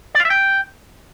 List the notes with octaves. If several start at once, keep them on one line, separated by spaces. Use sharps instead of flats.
D5
F5
E5
G5